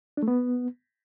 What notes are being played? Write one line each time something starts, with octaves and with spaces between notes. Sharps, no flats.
D4
A3
B3